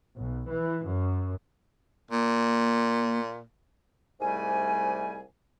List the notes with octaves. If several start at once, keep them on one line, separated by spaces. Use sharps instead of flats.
B1
E3
F#2
A#2 A#3
C2 G#2 G3 A3 G#5